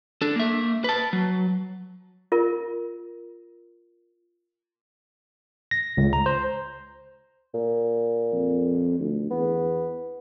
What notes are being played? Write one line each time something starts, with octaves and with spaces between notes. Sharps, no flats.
D4 A4
A#3 E5
B4 A5
F#3
F4 A#4
A#6
C#2
A#5
C5
A#2
F2
D2
E2 B3